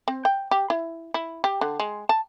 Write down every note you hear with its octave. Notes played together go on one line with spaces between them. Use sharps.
C4
G5
G4
E4
E4
G4
D3
G#3
A5